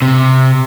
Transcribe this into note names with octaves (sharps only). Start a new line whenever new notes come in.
C3